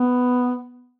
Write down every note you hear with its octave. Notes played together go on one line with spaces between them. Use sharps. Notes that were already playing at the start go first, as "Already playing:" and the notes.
Already playing: B3